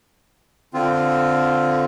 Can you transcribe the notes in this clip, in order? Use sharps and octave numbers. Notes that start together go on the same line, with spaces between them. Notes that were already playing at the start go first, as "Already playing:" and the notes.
D3 C4 F4